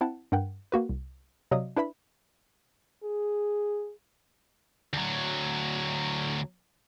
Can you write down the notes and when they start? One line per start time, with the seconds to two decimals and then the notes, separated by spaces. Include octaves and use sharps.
0.01 C4 E4 F#5 G5 A5
0.32 G2 A#4 F#5 G5
0.72 A#3 F#4 B4
0.89 C2
1.51 C3 F#3 D5 D#5 F5 D#6
1.76 D4 E4 B4 E5 B5
3.03 G#4
4.93 D2 F#3